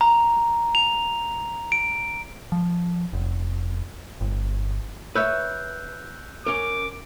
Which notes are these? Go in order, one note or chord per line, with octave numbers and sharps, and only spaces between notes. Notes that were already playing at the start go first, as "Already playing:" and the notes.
A#5
F7
D7
F3
F1
G1
B4 C#5 E5 E6 F#6 G6
C#4 A#4 D6